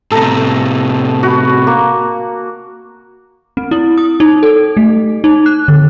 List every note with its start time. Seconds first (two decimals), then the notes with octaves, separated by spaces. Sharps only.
0.11 A2 C3 A4 A#5
1.23 F#4 B5
1.67 A#3
3.57 C4
3.71 E4
3.98 D#6
4.20 D#4
4.43 A4
4.77 A3
5.24 D#4
5.46 F#6
5.68 D3